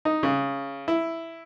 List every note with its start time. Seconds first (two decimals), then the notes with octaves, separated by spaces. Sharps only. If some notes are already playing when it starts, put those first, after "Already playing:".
0.05 D#4
0.23 C#3
0.88 E4